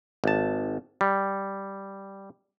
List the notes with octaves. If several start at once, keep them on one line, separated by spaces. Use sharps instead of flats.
G#1 A5
G3